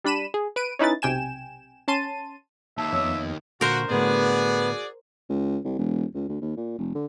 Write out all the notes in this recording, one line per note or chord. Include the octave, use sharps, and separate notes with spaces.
G3 D4 B5 D#7 E7
G#4
B4 D7 D#7
C#4 D#4 E4 B4 A6
B1 C3 G5 G#5 E7
C#4 A5 C6 D#7
D#2 E5 A5
F2 B3 C#5 E6
A#2 D3 F#4 A#4 C5
A2 D3 A3 B3 F#4 G#4 D5
C#2
C2
E1
C#2
D2
D#2
A#2
F1
D3